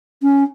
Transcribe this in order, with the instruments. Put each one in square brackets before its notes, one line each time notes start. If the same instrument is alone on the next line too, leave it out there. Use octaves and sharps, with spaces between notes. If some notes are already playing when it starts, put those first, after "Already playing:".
[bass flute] C#4